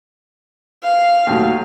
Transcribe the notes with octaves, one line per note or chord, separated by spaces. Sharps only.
F5
D#2 A2 F#3